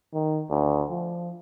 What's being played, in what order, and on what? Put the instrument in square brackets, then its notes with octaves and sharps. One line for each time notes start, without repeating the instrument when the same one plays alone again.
[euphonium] D#3
D2
F3